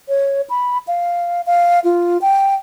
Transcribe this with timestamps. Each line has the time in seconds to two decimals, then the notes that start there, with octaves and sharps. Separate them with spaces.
0.09 C#5
0.50 B5
0.87 F5
1.46 F5
1.84 F4
2.21 G5